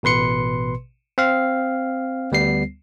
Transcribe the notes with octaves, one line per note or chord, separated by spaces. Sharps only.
A1 B2 B4 C6 C#7
C4 F5
D2 G3 B3 C7